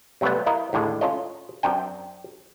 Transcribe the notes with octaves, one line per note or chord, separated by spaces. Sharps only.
C3 F#3 G3 A3 B3
E4 A#4 D#5 F5
D#2 A2 D3 G#3 D4
C#4 F4 A4 C#5 D#5
F#2 C4 D4 G5